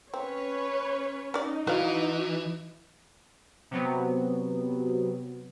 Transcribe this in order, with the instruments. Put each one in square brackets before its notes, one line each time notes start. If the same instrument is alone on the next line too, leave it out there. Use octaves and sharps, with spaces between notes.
[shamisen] C4 [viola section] C#4 B4 C#5
[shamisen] C#4 D5 [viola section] D#4
[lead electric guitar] E3 [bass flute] F#4 [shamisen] B4 D5 F5
[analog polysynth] C3 F#3 B3